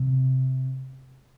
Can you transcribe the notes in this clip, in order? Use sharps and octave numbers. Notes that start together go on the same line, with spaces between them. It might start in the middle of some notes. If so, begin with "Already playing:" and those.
Already playing: C3